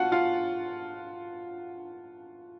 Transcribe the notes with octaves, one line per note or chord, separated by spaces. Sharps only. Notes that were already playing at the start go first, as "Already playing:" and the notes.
Already playing: F4 F#4 F5 F#5 A5
F4 F5